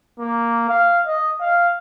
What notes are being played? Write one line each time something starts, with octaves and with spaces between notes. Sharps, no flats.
A#3
F5
D#5
F5